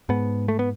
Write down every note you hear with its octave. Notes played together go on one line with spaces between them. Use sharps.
G#2 B3
A3
B3